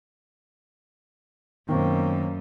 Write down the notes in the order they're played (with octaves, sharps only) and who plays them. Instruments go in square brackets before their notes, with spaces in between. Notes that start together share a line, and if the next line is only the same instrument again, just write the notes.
[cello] F#2 [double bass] B2 A#3 [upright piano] D#3 C4